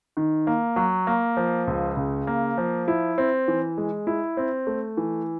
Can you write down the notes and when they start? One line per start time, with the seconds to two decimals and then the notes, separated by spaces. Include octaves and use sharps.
0.17 D#3
0.47 A#3
0.76 F#3
1.07 A#3
1.37 F3
1.67 C#2
1.97 C#3
2.27 A#3
2.58 F3
2.88 E4
3.18 C4
3.48 E3
3.78 G#3
4.07 E4
4.37 C4
4.67 A3
4.97 E3